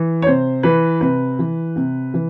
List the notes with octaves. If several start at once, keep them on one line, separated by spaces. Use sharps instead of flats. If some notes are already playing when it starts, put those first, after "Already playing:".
Already playing: E3
C#5
C3 C5
E3 B4
C3 B4
E3
C3
E3